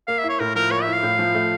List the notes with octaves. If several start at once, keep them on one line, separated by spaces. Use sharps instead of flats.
A#3 F5
E5
E4
C#5
A2 A#4
F3 A#4
A#3 C#5
E4 E5
F5
A2
F3
A3